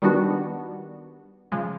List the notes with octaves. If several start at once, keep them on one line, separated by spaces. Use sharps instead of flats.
D#3 G3 B3 D4 F#4
C#3 F3 G#3